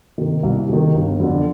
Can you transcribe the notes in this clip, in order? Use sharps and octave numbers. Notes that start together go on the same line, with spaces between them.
C3 D#3
C2
C3 D#3
G1
F2 D3